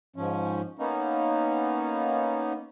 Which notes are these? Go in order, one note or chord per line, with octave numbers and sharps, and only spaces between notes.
G#2 F3 C#4
A#3 B3 C#4 D#4